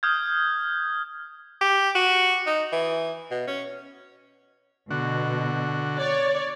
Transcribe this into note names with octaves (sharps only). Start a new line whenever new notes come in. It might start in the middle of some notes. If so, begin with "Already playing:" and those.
D#6 F6 G6 G#6
G4
F#4
D#4
E3
B2
C#4
B2 D3 F#4
C#5 D5